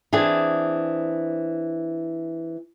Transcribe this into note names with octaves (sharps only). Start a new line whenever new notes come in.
E3 C4 D4 G#4